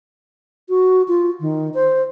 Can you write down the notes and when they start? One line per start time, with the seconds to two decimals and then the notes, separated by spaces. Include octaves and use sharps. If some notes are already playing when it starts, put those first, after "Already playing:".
0.69 F#4
1.08 F4
1.40 D#3
1.74 C5